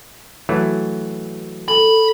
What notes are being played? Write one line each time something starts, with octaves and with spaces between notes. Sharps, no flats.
E3 F#3 A3
A4 B5